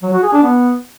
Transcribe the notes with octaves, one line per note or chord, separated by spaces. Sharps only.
F#3
F#4
G#4
D4
B3